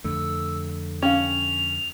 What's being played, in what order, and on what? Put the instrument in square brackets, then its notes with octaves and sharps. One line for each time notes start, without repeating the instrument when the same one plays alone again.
[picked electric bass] F2 D3 A3 [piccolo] E6
[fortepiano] C#4 [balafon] F5 G5 [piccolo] F7